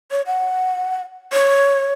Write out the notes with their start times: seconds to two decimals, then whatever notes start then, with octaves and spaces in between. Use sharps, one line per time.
0.11 C#5
0.26 F#5
1.33 C#5